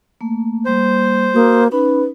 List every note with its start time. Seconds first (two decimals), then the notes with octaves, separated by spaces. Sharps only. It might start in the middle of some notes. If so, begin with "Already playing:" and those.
0.21 A3 A#3
0.65 G3 A#3 C5
1.34 A#3 F#4 D#6
1.72 C#4 D#4 B4 B5